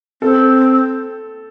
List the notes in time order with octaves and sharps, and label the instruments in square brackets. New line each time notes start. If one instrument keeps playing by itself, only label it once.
[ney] C4 [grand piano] A4